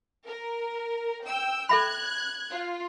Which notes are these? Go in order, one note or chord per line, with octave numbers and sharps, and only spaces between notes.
A#4
G5 E6 G6
A4 E5 B5 F#6 G#6
F4